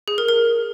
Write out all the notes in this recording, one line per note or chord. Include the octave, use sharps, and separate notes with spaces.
G#4
A#4
A#4